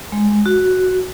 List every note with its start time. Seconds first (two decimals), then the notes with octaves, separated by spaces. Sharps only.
0.12 G#3
0.46 F#4